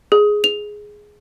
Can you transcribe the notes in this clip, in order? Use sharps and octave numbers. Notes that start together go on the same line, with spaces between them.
G#4
F7